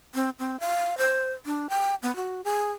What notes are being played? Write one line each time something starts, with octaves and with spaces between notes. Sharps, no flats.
C4
C4
F5
C5
D4
G5
B3
F#4
G#4